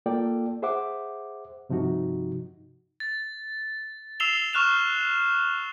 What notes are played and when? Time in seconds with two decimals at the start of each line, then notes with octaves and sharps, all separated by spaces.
0.06 A#3 F4 A4 D5 G5
0.62 G#4 C5 E5 F#5 D6
1.69 G2 C3 F3 D#4 F#4
3.00 A6
4.20 E6 C7 E7 F7 G7
4.53 C#6 F6 F#6 E7 F7